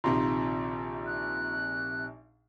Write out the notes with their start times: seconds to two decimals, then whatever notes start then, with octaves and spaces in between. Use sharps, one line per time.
0.04 A#1 C3 D#3 F4 A#5 C6
1.06 F#6